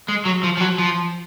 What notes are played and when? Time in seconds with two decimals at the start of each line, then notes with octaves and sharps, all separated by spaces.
0.08 G#3
0.25 F#3
0.43 F3
0.57 F3
0.61 F#3
0.78 F3